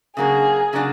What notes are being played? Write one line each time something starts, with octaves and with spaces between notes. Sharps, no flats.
C#3 F#3 A#3 D4 F#4 G#4
C#3 F#3 A#3 D4 F#4